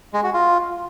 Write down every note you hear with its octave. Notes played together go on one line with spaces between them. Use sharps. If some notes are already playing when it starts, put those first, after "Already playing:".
G#3
F#4
F4